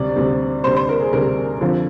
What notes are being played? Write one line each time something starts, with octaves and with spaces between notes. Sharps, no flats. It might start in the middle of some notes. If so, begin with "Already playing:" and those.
Already playing: D2 C3 G3 D5
D2 C3 G3
D2 C3 G3 C5
C5
A#4
G#4
D2 C3 G3 A#4
F2 D3 F3